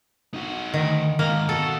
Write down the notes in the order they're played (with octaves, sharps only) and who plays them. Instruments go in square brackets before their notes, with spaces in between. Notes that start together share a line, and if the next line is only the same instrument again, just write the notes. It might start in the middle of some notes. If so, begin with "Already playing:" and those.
[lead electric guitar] D#4 F#4
[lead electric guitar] D2 [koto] D#3
[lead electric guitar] G#2 D#3 [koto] A#3
[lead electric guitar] B2 F#4 [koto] A4